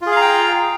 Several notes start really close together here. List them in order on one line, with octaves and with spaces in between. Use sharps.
F4 G#4 F5 A#5 G5